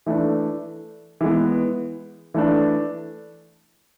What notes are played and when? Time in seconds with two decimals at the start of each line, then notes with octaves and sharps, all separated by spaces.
0.06 E3 A3 D4
1.21 E3 G#3 B3
2.34 E3 A3 D4